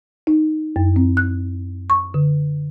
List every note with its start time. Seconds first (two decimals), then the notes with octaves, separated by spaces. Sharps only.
0.27 D#4
0.76 F#2
0.96 C4
1.17 F#6
1.90 C#6
2.14 D3